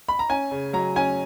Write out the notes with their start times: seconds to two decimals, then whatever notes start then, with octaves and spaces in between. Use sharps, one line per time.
0.09 B5
0.19 A#5
0.29 C#4 G#5
0.51 C#3
0.73 F#3 A#5
0.96 C#4 G#5